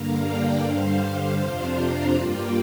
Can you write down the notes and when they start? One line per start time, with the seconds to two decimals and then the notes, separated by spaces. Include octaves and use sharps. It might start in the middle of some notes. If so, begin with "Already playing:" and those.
Already playing: G2 D3 A#3 F5 A#5
0.24 D5 G5
0.63 G2 D3 G3 C5 F5
1.39 F2 C3 F3 D4 F4
1.77 F5 A#5
2.15 G2 G3 A#3 F4 D5 G5